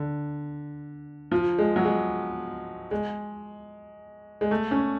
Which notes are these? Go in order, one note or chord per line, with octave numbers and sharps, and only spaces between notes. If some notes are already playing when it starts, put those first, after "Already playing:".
Already playing: D3
F3
G#3
F#3
G#3
G#3
G#3
A3
C#4